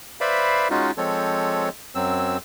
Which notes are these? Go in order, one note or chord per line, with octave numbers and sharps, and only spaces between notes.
B4 C5 D5 E5 F5 B5
G#3 C#4 D#4 F4 F#4
F3 G#3 C4 A4 C#5
F#2 F#3 C4 E6